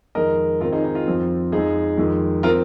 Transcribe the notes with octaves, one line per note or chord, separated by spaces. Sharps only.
F2 D#3 G#3 A#4 D#5
G#2 D#3 C4 F4 A#4
D#4 G#4
D#4
F4
F2 F3 C4
F2 F3 G#3 D#4 G#4
F2 D#3 G#3
F3 C4 F4 A#4